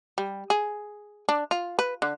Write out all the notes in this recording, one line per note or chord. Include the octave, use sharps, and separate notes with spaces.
G3
G#4
D4
F4
B4
D3